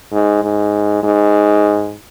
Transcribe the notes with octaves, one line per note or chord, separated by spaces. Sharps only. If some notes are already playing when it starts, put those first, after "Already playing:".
G#2
G#2
G#2